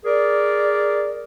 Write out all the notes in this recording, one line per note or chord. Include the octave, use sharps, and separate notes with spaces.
G#4 A#4 D5